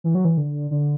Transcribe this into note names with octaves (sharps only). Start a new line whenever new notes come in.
E3
F#3
E3
D3
D3